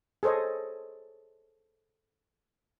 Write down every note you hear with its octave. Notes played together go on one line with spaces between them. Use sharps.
G#4 A4 C5 C#5 D#5